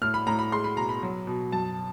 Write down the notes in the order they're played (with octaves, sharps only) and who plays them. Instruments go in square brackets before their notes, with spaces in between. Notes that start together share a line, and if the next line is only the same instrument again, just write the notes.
[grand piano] A2 F6
B5
A2 A#5
B5
G#3 C6
B5
B2 A#5
B5
F#3
B2
F#2 A5